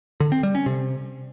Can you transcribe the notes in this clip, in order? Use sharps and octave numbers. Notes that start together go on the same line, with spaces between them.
D3
C4
G3
C#4
C3